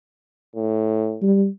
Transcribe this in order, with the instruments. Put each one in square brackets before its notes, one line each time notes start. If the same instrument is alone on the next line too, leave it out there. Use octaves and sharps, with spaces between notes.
[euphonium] A2
[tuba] G3